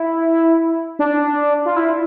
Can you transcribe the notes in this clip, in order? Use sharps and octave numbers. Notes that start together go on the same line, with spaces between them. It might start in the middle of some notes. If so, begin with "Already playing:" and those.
Already playing: E4
D4
F4
E4